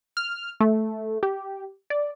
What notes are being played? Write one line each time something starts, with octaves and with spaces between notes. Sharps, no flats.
F6
A3
G4
D5